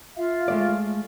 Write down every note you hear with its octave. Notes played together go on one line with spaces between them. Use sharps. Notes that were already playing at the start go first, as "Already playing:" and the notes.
F4 E5 F5
G#3 A3 D5